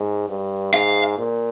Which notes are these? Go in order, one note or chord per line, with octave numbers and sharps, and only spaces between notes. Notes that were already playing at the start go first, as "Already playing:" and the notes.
Already playing: G#2
G2
G#2 F5
A#2